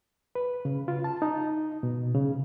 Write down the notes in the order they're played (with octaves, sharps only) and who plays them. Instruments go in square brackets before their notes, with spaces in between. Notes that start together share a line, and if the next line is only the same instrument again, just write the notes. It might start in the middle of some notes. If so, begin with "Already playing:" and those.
[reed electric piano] B4
C#3
F4
A5
D#4
B2
C#3